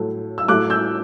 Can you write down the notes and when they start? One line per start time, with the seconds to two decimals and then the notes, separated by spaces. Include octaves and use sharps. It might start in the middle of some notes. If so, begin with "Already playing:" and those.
Already playing: A2 F#3 A3
0.38 E6
0.48 A2 F#3 A3 D6 F#6
0.70 E6 G6